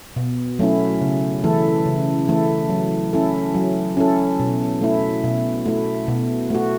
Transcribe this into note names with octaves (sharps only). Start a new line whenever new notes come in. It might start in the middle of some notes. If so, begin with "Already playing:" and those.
B2
F#3 A3 C#4 E4
C#3
E3 A3 E4 A4
C#3
E3 A3 E4 A4
F#3
C#4 E4 A4
F#3
C#4 E4 A4
B2
A3 E4
B2
A3 E4
B2
A3 F#4